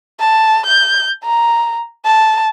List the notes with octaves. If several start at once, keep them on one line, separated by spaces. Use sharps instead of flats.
A5
G6
A#5
A5